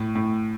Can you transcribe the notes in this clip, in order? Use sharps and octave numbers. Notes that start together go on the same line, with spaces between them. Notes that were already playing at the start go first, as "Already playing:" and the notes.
Already playing: A2
A2